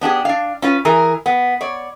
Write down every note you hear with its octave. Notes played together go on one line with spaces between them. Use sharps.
B3 D4 G4 G#4
D4 F5
C#4 F4 B4
E3 G#4 A#4
B3
C#5 D5